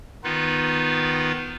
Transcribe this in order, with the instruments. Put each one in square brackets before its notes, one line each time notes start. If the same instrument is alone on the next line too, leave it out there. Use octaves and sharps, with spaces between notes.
[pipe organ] D#3 B3 D#4 F4 B4